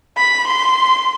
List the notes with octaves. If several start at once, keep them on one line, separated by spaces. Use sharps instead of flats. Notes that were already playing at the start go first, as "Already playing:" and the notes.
B5
C6